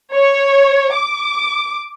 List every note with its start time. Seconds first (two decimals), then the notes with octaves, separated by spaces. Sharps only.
0.13 C#5
0.94 D6